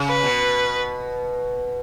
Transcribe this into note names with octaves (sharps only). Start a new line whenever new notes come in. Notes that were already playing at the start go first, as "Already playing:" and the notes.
Already playing: C#3
B4
B2